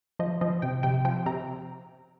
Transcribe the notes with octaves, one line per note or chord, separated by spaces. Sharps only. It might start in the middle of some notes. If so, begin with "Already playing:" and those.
F3 D#5
F3 D#5
C3 G5
C3 G5
F3 G5
C3 A#5